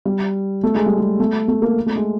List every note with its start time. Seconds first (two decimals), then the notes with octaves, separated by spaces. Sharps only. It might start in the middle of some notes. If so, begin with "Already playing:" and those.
0.05 G3
0.63 A3
0.75 G#3
0.86 G3
0.98 G#3
1.20 A3
1.48 A3
1.62 A#3
1.86 A3
1.96 G#3